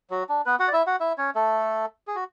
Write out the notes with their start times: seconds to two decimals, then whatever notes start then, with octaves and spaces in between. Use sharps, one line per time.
0.10 F#3 F#4
0.29 D4
0.46 B3 B4
0.59 F#4 F#5
0.68 D5
0.73 E4 E5
0.87 F#4 F#5
1.00 E4 E5
1.18 C#4 C#5
1.35 A3 A4
2.07 G#4
2.15 F#4